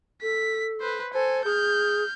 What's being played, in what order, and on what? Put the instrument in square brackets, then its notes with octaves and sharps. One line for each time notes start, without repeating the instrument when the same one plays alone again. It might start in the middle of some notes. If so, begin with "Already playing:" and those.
[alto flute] A4 [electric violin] B6
[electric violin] B4 C5
[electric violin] A4 G#5 [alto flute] C5
[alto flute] G#4 [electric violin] F6 G6